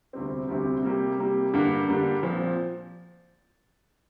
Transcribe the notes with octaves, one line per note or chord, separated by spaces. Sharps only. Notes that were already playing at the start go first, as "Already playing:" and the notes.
D2 C3 G3 C4
D2 C3 G3 C4
C3 G3 A#3 G4
C3 G3 A#3 G4
G2 D3 G3 A#3 D4
G2 D3 G3 A#3 D4
A#2 F3 C4